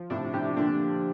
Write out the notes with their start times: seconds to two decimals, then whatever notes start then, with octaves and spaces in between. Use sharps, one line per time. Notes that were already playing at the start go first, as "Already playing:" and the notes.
Already playing: F3
0.10 A2 C3 D4
0.33 A2 C3 G4
0.56 A#2 D3 D4